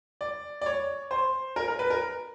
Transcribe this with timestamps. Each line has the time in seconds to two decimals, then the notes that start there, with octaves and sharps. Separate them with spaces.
0.21 D5
0.61 D5
0.66 C#5
1.11 C5
1.56 A#4
1.68 A#4
1.79 B4
1.90 A#4